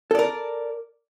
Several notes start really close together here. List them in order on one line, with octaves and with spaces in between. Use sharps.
A4 D5 A#4